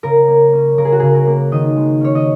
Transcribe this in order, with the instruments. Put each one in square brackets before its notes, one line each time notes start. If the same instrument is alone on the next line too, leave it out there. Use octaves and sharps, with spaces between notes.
[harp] C#3 A#4
A#3
C#4
C#3 A#4
G#4
F#4
C#3 G#4
A#4
A#3
D#3 D#5
G#3
C#4 C#5
D#5